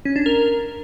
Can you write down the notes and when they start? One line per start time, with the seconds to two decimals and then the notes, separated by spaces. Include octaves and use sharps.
0.05 C#4
0.16 D4
0.26 A#4